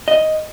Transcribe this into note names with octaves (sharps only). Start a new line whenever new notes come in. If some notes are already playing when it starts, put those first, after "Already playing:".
D#5